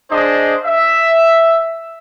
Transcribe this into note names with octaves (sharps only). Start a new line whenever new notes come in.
D4 G#4 C5 D#5
E5